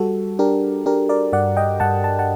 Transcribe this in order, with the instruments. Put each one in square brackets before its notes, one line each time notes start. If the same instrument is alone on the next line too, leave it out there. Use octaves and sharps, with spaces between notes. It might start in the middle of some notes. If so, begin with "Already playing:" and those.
Already playing: [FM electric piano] G3 F#4 A4
D4 G4 A#4
D4 G4 A#4
A#4 D5
G2 D5 F#5
D#5 G5
G2 F#5 A5
A5
F#5 A5